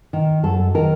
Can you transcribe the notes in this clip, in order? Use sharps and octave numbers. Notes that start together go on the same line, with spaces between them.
D#3
F#2 A4
D#3 A#4